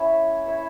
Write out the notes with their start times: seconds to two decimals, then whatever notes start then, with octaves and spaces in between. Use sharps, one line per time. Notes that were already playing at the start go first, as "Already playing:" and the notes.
Already playing: C#4 E4 C#5 E5
0.46 E4 C#5 E5